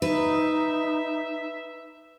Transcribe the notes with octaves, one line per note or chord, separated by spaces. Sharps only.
D#4 B4 E5